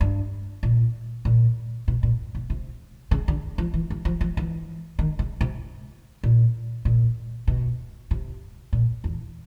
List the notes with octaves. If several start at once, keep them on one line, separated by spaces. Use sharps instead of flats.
G2
A#2
A#2
B2
A#2
B2
C3
C#3
D3
F3
E3
E3
F3
F3
E3
D#3
C#3
C3
A#2
A#2
B2
C3
A#2
E2